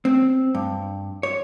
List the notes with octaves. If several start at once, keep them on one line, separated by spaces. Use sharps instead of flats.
C4
G2
C#5